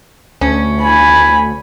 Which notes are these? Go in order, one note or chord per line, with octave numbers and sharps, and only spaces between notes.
D2 C#4
G#5 B5